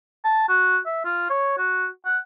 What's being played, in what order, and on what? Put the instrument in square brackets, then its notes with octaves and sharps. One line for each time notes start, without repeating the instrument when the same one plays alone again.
[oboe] A5
F#4
E5
F4
C#5
F#4
F#5